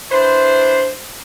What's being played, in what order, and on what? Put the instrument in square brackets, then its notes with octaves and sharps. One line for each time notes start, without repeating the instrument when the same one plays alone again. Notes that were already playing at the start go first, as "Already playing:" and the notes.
[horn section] D4 E4 B4 C5